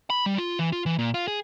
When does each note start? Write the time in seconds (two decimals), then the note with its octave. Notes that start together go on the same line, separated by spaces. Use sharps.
0.10 B5
0.26 G3
0.38 F4
0.59 E3
0.72 F4
0.86 E3
0.99 A#2
1.14 F4
1.28 G#4